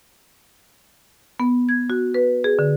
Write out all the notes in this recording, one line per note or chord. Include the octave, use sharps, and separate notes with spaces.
B3
G#6
F#4
B4
G#4
D3